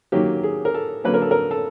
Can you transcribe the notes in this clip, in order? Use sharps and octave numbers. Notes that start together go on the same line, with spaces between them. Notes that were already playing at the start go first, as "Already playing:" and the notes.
D#3 F#3 A#3 C#4 G4
G#4
A#4
A4
D3 F#3 A#3 C#4 B4
A#4
A4
A#4
A4